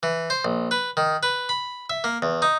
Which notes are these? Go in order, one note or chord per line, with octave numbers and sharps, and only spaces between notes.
E3
C5
A#1
B4
D#3
B4
B5
E5
A#3
E2
D#4